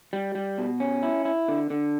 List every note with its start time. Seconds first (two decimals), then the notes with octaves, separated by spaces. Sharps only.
0.13 G3
0.35 G3
0.58 B2
0.80 C#4
1.03 E4
1.25 E4
1.48 D3
1.70 D3